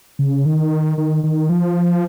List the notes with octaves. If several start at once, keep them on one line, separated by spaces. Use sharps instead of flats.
C#3
D#3
D#3
D#3
F3